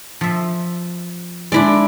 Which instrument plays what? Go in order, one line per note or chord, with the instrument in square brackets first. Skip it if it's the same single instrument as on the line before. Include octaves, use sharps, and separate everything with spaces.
[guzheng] F3 E5
[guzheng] G#3 D4 [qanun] E4 D5